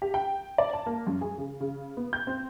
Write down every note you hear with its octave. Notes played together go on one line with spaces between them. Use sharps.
G4
G5
D5
A5
A#3
F#2
G#4
C#3
C#3
B3
G6
C4